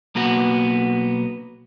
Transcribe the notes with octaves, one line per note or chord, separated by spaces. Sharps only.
B1 A#3 B3 F#4 F#5